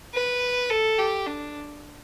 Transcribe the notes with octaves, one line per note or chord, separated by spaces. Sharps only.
B4
A4
G4
D4